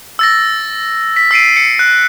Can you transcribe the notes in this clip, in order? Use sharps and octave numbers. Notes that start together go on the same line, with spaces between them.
E6 A6 A#6
B6
E6 C7 D7 D#7
C#7
F#6